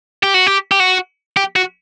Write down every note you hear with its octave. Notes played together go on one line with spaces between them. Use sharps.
G4
F#4
G4
G4
F#4
G4
F#4